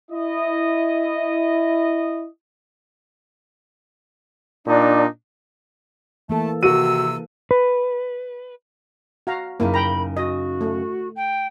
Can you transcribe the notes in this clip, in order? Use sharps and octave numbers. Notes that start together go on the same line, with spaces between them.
E4 D#5
A#2 D4 D#4
E3 A3 A#3 A4 A5
C3 D#3 F#4 E6 D#7
B4
F#4 F5 A#5
F#2 C#3 A#3 D#4 E4
G5 A#5 B5
F#4 D#5
A3
G5